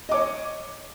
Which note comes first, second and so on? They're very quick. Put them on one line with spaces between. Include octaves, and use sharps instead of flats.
D#5 D6 C#5